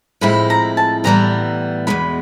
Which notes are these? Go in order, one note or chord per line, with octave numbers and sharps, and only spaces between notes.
A2 F3 G#3 C4 E4 B5
A#5
A5
A2 E3 G3 B3 A#5
E2 B2 G#3 B5